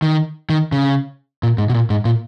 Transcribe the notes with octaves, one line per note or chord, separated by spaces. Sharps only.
D#3
D#3
C#3
A#2
G#2
B2
A#2
G#2
A#2